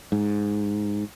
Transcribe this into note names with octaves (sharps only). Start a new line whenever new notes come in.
G#2